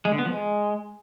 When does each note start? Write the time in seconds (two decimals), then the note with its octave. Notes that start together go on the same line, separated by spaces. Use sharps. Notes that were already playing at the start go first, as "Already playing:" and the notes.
0.05 G#3
0.12 D3
0.18 B3
0.25 F3
0.32 G#3